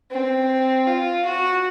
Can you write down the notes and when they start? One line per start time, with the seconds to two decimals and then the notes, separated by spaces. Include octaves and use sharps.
0.11 C4
0.87 F4
1.25 F#4